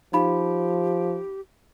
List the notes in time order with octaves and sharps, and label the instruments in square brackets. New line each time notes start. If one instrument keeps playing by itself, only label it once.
[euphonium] F3 [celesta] D#4 F5 B5 [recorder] G4